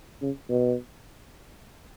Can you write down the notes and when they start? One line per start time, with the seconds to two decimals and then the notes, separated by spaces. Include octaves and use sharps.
0.22 C#3
0.50 B2